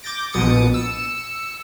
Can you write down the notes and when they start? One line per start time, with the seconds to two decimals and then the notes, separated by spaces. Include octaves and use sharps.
0.03 D6 G6 A6 A#6 D7
0.32 A#1 B2 D#6 A6 C#7 D7
0.74 E6 C#7